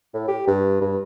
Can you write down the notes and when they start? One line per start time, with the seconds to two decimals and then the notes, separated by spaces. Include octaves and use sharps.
0.14 A2
0.28 G4
0.47 G2
0.81 G2